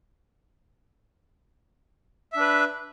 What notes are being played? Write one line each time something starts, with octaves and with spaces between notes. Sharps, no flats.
D4 B4 E5